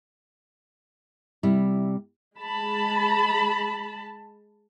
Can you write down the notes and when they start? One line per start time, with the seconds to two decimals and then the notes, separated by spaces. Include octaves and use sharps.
1.43 C3 G3 E4
2.38 G#3 A5 B5